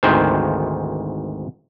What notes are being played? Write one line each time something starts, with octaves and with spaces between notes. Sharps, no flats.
G#1 D2 D#3 E3 C5